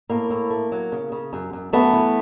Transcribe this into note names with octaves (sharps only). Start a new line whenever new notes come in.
A2 A#3
A2
A3
F#3
C#3
C#3
F#2
F#2
F#2 A3 B3
E3